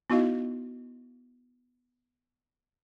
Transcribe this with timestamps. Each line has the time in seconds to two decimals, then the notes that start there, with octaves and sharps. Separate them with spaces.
0.10 B3 D#4 E4 F#4 D#5 F5